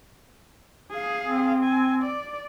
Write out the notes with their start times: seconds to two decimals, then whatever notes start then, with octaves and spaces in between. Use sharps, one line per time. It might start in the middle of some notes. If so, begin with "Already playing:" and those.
0.91 G#4 F5
1.23 C4
1.64 G#5
2.03 D5